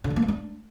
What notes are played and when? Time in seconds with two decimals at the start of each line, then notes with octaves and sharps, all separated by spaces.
0.04 D3
0.10 G3
0.16 A#3
0.22 G#3
0.28 D4